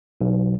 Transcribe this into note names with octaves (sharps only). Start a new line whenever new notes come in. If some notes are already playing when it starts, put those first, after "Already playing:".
B1